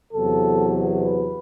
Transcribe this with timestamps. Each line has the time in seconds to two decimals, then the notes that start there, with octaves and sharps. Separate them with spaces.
0.13 E2 C3 F#3 B3 A4
1.01 B4